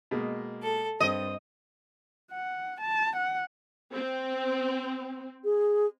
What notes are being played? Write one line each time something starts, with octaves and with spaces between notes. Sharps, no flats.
B2 G#3 A#3
A4
G2 C4 D#5
F#5
A5
F#5
C4
G#4